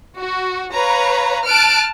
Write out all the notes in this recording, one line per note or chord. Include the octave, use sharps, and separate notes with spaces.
F#4
B4 C#5 F5 A#5
A5 F6 F#6 D7